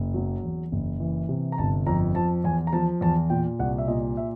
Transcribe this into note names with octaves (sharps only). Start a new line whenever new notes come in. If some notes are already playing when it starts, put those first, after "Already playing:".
Already playing: F#1
F#3
E2
F#1
E3
C3
A#5
G1 A5
F2 A#5
F3 A5
E2 G#5
A#5
F3 A5
E2 A5
A#2 G5
C2 F#5
E5
A#2 D#5
E5